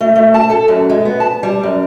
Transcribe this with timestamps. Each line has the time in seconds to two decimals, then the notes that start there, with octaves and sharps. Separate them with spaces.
0.01 A3
0.15 A3
0.34 A5
0.50 A4
0.68 F#2
0.90 G#3
1.05 B3
1.20 A5
1.43 G3
1.63 F#2